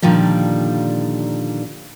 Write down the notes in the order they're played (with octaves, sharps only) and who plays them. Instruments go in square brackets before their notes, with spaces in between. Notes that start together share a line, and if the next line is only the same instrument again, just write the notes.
[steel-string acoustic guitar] A#2 D3 D#3 F3 G3